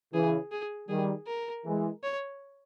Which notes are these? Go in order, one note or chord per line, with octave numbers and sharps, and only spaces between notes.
C#3 E3 G#4
G#4
D#3 G3 G#4
A#4
E3 G#3
C#5